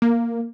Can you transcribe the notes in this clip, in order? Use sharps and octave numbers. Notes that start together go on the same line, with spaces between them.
A#3